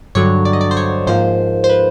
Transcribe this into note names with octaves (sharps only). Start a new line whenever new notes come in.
G2 D3 F#3 C#5
D5
D#5
D5
C5
C#5
G#2 F3 A#3 C5
C5
B4